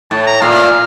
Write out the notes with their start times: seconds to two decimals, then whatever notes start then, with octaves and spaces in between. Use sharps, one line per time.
0.11 A2 A5
0.22 A5
0.27 A#5
0.41 A#2 F5